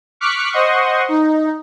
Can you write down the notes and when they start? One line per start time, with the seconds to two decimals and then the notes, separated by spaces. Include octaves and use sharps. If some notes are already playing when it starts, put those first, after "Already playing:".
0.20 C#6 D6 F6 F#6 B6 C#7
0.52 C5 D#5 F#5 C6 C#6 D#6
1.09 D#4